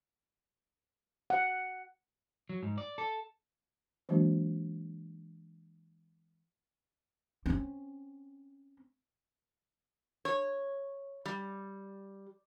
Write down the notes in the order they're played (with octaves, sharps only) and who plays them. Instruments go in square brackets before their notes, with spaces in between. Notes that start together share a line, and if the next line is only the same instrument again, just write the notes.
[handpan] F#5
[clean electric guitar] F#3
G#2
D5
A4
[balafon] E3 F#3 G#3 A#3 D4 F#4
[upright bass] C4 C#4
[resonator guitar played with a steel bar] C#5
G3